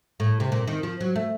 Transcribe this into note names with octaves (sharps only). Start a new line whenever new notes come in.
A2
C3
A#2
D#3
F3
F#3
A3